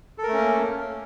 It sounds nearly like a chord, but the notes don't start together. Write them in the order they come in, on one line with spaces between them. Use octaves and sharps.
A4 A#4 A3 C#4 A#3